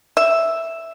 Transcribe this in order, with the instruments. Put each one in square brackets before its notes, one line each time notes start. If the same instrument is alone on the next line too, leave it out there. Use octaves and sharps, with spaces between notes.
[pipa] E5